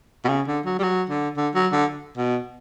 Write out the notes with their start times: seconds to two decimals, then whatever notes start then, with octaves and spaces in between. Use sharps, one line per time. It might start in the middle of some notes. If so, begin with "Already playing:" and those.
0.25 B2
0.28 C#3
0.47 D3
0.65 F#3
0.79 G3
0.83 F#3
1.09 D3
1.37 D3
1.55 F#3
1.72 D3
2.17 B2